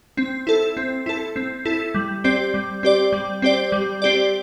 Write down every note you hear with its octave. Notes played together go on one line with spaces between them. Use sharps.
C4
E4 A4
C4
E4 A4
C4
E4 A4
G3
C4 G4 D5
G3
C4 G4 D5
G3
C4 G4 D5
G3
C4 G4 D5